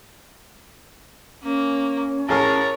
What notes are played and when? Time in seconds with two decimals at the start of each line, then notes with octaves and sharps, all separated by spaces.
1.43 A#3 C#4
2.28 A1 G#4 A#4 C#5 A5 F6